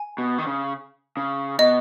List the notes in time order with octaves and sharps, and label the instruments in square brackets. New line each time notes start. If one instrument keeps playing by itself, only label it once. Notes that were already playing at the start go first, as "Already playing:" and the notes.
Already playing: [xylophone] G#5
[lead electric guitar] B2
D#3
C#3
C#3
[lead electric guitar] B2 [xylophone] D#5